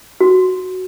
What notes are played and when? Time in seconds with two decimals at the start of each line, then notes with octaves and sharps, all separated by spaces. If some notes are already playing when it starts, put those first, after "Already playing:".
0.21 F#4